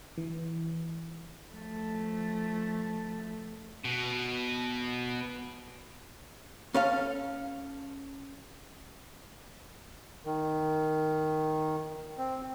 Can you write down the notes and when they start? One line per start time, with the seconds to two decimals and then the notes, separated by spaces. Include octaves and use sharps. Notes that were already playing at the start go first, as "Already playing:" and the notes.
0.18 E3
1.53 F3 A3
3.84 B2
6.74 C#4 A4 F5
10.25 D#3
12.18 C4